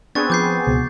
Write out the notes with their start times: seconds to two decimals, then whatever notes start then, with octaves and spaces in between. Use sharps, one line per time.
0.15 B3 C4 D4 G#4 C#6 A6
0.30 F3 D6 G6 C7
0.67 C#2 B2